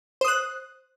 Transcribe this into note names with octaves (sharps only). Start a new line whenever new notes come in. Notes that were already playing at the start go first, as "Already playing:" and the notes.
C5 D#6 F#6